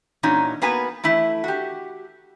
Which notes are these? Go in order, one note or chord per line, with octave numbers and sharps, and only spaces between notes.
A#2 E3 C#4 D#4 F#4
A#3 B3 F#4 B4 G#5
E3 A3 E4
F#4 G4